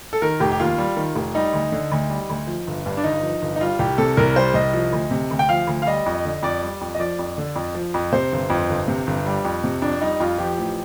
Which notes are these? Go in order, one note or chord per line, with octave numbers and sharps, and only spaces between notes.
A4
D#3 A#4
F1 G4
G4
D#2 F4
G3
D#3
F1
G3 D#4
D2
D3
D2
G3
D2
F3
G1
G2
D4
G1 D#4
F3
G1
D#4
G3 F4
C2 G4
C3 A4
C2 A#4
G3 C5
C2 D#5
F3
D2
C3
D2
G5
F3 F5
D2
F5
G3 D#5
F2
D#5
D3
F2 D5
G3
F2
D#5
F3 D5
F2
D3
F2
F3
F2
C3 C5
G1
F2
G1
C3
G1
G3
F2
C3
F2 D4
G3 D#4
F2 F4
F3 G4
A1